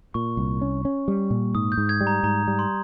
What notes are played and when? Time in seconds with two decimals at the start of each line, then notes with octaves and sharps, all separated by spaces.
0.14 A#2 C#6
0.37 C2
0.61 C#4
0.85 C#4
1.08 G3
1.30 A#2
1.55 G#2 D#6
1.72 G6
1.78 G#2
1.89 G#6
2.01 G3
2.07 A#5
2.23 G#2 A#5
2.47 G3
2.59 C6